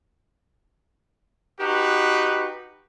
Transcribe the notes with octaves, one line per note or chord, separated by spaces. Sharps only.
D#4 F#4 G4 B4